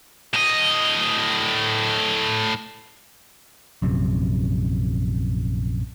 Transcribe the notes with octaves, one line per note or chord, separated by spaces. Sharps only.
A2 D#5
A#1 F#2 C3